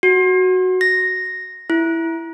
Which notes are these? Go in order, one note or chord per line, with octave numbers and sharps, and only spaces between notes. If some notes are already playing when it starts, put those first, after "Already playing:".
F#4
A#6
E4